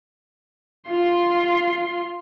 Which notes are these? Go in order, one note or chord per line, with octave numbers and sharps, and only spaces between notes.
F4 C6